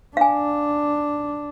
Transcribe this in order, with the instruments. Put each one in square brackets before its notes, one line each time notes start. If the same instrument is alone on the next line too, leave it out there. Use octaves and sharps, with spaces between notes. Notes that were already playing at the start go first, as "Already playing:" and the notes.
[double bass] D4 [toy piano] F5 G#5